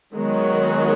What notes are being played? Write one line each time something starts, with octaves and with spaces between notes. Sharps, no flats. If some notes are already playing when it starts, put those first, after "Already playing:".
D#3 F#3 G#3 B3 F#4 C#5